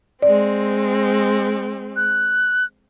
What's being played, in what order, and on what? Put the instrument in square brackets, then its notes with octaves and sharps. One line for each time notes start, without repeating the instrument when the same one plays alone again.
[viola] G#3 C4 [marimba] D5
[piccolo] F#6